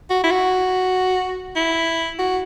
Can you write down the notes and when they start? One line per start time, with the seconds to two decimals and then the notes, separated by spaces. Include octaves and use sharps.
0.10 F#4
0.24 E4
0.31 F#4
1.56 E4
2.19 F#4